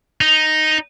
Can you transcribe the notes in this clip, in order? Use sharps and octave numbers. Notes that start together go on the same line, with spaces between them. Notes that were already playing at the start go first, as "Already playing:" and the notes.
D#4